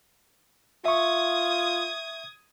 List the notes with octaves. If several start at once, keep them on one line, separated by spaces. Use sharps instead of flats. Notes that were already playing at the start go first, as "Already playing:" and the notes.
F4 E5 C#6 D#6 G#6